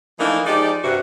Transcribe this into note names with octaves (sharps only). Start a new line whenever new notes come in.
E3 F3 A3 A#3 D4 D#4
F3 G#3 D#4 G4 D5
G2 C3 F#4